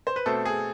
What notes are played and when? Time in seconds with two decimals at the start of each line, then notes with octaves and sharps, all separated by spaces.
0.07 C5
0.16 B4
0.26 B2 A3 C4 A4
0.45 G#4